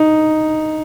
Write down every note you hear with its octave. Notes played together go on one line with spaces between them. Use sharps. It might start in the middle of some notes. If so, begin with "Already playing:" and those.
Already playing: D#4